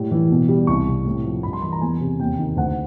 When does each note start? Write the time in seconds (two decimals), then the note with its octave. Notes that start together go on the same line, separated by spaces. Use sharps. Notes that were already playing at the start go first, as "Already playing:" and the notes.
Already playing: A2 G3
0.11 E3
0.31 B2
0.48 G3
0.67 C2 C#6
0.87 C3
1.05 A2
1.25 F3
1.43 G2 B5
1.53 C6
1.62 E3 B5
1.72 A#5
1.81 E2 G#5
2.01 C3
2.20 D#2 G5
2.39 D#3
2.57 D2 F#5